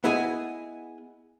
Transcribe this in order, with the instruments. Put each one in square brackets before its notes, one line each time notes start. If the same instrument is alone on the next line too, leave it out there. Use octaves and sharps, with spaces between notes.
[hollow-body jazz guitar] B3 E4 G#4 D#5 G#5